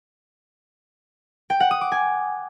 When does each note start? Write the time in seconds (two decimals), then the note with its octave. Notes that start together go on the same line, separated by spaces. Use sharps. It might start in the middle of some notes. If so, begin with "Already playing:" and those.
1.50 G5
1.60 F#5
1.71 D#6
1.81 D6
1.92 G#5